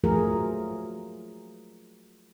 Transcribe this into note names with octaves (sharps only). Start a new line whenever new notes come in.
F3 F#3 A3 F4 G#4 A#4